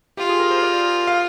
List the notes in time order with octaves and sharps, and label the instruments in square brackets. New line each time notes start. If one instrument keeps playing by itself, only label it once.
[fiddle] F4 [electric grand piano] G4
[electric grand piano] G#4
A#4
C5
D5
F5